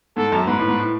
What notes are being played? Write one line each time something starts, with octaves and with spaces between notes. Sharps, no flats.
G#2 A4
F#2
G#2 B4
A2
G#2
A2